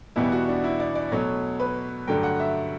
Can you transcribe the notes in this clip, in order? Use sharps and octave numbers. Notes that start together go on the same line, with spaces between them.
E2 B2 G3 B3 E4
F#4
D4
E4
D5
D5
B2 F#3 A3 C#5
B4
G2 D3 F#3 A3 G5
F#5
E5